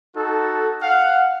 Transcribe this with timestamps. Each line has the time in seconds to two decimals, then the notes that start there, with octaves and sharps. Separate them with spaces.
0.16 D#4 F#4 A4
0.82 F5 F#5